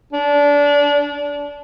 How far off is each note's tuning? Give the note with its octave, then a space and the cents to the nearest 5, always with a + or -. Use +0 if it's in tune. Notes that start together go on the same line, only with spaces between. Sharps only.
D4 -25